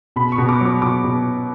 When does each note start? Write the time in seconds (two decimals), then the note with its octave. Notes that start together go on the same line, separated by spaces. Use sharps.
0.16 B2 B5
0.32 C#6
0.38 B2
0.49 D6
0.61 F#3 D6
0.82 B2 D6
1.04 B2